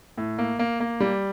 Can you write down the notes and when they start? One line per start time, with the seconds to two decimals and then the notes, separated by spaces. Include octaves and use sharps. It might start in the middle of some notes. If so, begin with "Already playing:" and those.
0.18 A2
0.39 A#3
0.59 A#3
0.80 A#3
1.00 G3